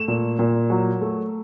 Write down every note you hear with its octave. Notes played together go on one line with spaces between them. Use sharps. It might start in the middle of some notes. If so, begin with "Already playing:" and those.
Already playing: A3 E7
A#2
A#2
F#3
A3